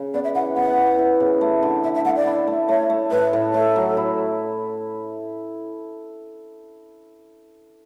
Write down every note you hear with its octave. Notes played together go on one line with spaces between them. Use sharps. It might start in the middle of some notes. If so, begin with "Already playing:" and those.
Already playing: C#3
B3 D5
E5
E3 F#5
B3 F#5
E3
E3
C#3
A3
D3
D3 E5
E5
A3 F#5
D5
E4
A3
A3 C#5
A3
A2 B4
A2
A2 A4
F#3
E4